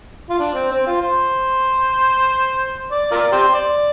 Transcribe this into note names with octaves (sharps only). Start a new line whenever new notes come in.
F4
D4
C4
C4
F4
C5
D5
F4 A#4 D5
G4 C5
D5